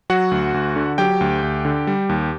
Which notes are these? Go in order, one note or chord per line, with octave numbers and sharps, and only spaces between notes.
F#3 F#4 F#5
D2
D2
D3
F#3 G4 G5
D2
D2
D3
G3
D#2